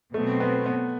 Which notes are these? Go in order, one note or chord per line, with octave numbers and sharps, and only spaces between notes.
B2 F#3 A3 C4
B3
B3